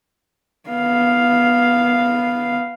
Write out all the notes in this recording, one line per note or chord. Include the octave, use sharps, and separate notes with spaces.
B3 F5